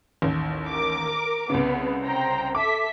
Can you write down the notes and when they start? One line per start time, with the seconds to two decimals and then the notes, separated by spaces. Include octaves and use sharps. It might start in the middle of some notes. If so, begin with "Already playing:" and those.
0.22 A1 D#2
0.67 A#4 D6
1.50 C2 C#3 B3
2.04 C5 G5 A#5
2.55 A4 E5 D6 B6